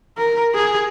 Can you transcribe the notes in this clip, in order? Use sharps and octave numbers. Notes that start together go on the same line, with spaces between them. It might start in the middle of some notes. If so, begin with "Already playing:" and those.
A#4
G#4